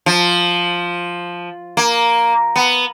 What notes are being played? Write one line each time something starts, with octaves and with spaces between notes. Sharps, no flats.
F3
A#3
B3